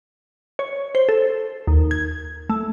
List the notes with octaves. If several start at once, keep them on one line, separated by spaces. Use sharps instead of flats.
C#5
C5
A4
D#2
G#6
A3